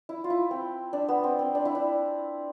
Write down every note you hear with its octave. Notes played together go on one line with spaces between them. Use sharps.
E4
F4
E4
C4
D4
B3
C4
C4
D4
E4
D4